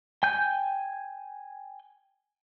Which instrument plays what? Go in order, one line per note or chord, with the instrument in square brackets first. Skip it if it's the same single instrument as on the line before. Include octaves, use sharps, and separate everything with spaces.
[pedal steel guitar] G5 G#5 G6